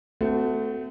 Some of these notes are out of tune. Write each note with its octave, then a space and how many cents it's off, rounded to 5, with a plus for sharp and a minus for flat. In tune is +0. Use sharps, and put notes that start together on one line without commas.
A3 +5 C4 -40 F#4 +0